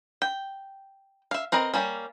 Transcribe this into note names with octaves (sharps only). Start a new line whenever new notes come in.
G5
E5 F5
C4 A#4 B4 D#5
G3 A#3 C#4